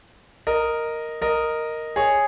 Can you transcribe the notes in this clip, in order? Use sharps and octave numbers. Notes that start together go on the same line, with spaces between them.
A#4 D#5
A#4 D#5
G#4 C#5